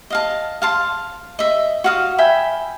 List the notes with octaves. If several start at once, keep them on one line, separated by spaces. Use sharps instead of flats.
D#5 F5 A5
F5 A5 C6
D#5 E5
F#4 F5 D#6
E5 G5 G#5 B5